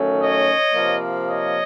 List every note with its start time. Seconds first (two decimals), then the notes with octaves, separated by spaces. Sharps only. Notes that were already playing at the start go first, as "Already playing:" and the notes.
Already playing: D#3 F#3 A3 C#4
0.20 C#5 D#5
0.74 C3 F3 A#3
1.27 C#5 D#5